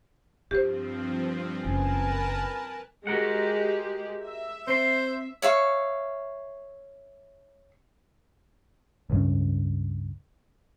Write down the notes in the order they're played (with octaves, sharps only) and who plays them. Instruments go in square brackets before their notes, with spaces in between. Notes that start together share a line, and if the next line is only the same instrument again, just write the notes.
[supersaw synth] G2 F3 C4 [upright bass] F4 [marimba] G4 C5
[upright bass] F#1 [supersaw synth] A#4 B4 A5 [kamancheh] G#5
[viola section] G#3 G4 [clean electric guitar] F#4 A#4 F#5
[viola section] E5
[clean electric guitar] C4 C6 [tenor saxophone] C5
[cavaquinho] C#5 E5 F5 C#6
[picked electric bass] C#2 G2 C#3